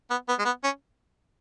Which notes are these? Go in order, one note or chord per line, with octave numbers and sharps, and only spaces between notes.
B3
B3
G#3
B3
C#4